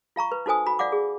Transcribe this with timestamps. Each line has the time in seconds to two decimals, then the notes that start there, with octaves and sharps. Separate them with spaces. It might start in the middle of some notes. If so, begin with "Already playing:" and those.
0.16 F4 F5 A#5 C#6
0.32 B4
0.46 D#4 F#4 A4 C5 G#5 D#6
0.66 F#4 B5
0.79 D5 F5 F#5 D6
0.92 G#4